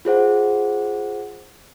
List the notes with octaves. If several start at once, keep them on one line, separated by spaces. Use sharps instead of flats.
F4 G#4 C5 F#5